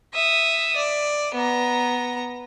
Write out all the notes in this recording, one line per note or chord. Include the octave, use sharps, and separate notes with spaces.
E5 D#6
D5
B3 A#5